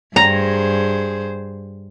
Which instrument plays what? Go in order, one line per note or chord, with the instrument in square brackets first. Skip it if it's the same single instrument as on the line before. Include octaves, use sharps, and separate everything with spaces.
[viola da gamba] G2 G#4 C5 [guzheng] A#5